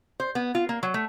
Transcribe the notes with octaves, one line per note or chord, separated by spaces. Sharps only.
C5
B3
F4
A#3
F#3
A3